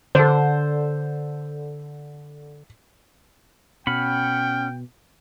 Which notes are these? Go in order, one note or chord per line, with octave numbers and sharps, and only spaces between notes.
D3 A4 C5
B2 C#4 F#5 G5 B5 F6